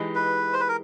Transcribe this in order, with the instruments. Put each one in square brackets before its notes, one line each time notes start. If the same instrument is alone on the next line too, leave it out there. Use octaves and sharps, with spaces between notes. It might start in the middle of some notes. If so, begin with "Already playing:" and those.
Already playing: [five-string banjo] E3 G#3 D#4 G4
[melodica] B4
C5
B4
A#4